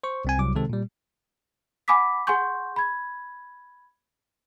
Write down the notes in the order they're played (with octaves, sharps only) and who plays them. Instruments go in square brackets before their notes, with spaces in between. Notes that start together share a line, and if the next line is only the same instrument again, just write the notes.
[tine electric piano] C5 C#6
C2 C4 G#5
C2 F#3 D6
C3 D#3 G#3 C4 A4
A#2 G3
[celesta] F#5 G#5 B5 D6 D#6 B6
G#4 F#5 G#5 C6 C#6 G6
B5 G#6